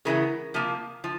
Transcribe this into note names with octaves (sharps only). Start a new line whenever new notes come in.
C#3 E3 G#3 B3 A#4
C3 F3 A#3
F3